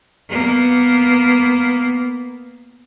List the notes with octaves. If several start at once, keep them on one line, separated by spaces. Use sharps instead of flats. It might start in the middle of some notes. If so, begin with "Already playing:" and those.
A#3 B3